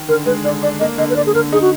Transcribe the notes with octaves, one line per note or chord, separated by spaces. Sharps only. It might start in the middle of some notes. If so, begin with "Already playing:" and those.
Already playing: D#3
D3 A#4
G#3 B4
D3 D5
D4 D5
A#3 D#5
D3 D#5
B4
D3 D5
G#4
D3 A#4
D#4 G#4
F#4